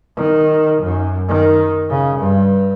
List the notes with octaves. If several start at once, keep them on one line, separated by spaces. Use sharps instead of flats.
D#3
F#2
D#3
C#3
G2